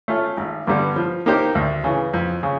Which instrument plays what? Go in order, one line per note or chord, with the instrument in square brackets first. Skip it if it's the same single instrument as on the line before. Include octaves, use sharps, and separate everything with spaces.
[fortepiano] A3 C#4 F4
G#1
G2 D3 G3 B3
F3
A#3 D#4 G4 C5
D2
C#3 E3
F2
C#3